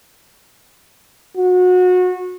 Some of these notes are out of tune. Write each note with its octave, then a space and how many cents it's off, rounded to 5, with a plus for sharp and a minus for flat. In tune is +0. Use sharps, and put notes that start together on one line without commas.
F#4 -25